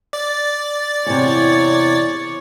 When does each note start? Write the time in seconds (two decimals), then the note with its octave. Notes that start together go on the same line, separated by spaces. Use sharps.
0.13 D5 A6
1.06 E2 C3 C#5